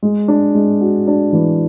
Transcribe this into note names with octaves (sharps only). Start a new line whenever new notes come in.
G#3
D4
G#3
F#4
D4
E3